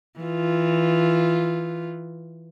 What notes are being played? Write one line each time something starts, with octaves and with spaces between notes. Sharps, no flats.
E3 F4